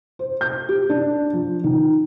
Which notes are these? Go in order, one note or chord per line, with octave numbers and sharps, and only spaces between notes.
C5
G6
G4
D4
F3
D#3